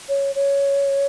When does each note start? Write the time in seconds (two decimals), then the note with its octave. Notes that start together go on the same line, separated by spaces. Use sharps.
0.09 C#5
0.35 C#5